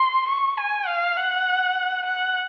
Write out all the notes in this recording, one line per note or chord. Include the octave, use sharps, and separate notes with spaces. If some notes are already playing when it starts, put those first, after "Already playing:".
Already playing: C6
C#6
G#5
F5
F#5
F#5